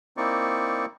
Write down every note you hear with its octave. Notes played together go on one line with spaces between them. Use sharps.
A#3 C4 D#4 E4 D5 C#6